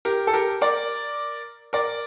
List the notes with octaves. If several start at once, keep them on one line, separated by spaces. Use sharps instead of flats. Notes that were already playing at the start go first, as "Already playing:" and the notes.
G4 A#4
A4
G4 A#4
A#4 D5
A#4 D5